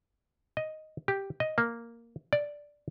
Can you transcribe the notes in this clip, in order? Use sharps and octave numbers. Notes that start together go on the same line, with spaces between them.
D#5
G4
D#5
A#3
D5